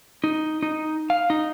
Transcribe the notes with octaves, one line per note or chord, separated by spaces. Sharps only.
D#4
D#4
F5
D#4